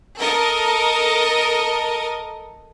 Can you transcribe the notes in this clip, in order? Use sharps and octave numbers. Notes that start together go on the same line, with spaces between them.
A4 A#4 D#5